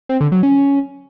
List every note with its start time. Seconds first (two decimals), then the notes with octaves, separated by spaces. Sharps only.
0.09 C4
0.21 D3
0.32 F#3
0.43 C#4